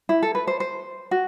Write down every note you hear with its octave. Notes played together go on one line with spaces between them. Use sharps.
E4
A4
B4
C5
C5
F#4